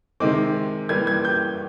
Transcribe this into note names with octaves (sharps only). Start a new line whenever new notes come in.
C3 D#3 G#3 C4 D6
E3 G3 A#3 G#6
G#6
G6